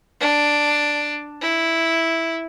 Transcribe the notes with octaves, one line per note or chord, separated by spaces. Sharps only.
D4
E4